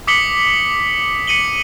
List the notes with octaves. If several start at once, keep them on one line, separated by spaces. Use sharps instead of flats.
D6 D#6 B6 C#7 F#7 G7
B6 C#7 D#7 F#7 G7